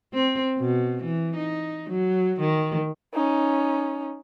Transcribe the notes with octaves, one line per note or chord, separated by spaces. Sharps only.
C4
B2
E3
D#4
F#3
D#3
C#4 D#4